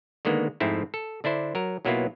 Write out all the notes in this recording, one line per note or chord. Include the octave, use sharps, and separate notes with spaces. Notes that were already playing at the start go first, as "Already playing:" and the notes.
D3 D#3 G#3 A#3 B3
F2 G#2 A3 C4 E4
A4
D3 D4 E4 C5
F#3 A#4
B1 F#3 A#3 B3 E4 F4